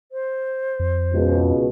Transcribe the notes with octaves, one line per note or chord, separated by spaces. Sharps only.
C5
F2
C#2 B2